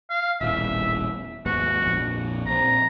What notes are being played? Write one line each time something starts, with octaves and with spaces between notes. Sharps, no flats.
F5
D#1 A1 E2 E5
D#2 G#2 B3 F#4
A#1 F2
A#1 C4 A#5